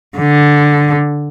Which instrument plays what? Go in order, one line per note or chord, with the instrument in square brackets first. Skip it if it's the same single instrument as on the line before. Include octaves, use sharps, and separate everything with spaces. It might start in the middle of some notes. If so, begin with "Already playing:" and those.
[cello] D3